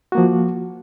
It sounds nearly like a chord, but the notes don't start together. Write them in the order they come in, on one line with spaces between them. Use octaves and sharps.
F#4 A#3 F3